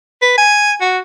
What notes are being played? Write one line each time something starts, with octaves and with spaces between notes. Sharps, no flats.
B4
G#5
F#4